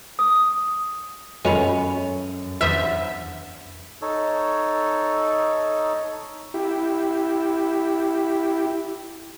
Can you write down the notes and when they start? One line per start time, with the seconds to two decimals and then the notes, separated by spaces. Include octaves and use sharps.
0.19 D#6
1.45 F#2 G#3 B3 C#4 F4 A4 B4
2.61 E2 D3 B3 C5 E5 D#6
4.02 D#4 A4 C#5
6.54 E4 G4